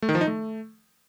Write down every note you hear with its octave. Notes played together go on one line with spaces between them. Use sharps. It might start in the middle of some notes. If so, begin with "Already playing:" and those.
A3
D#3
F3
D#4
A3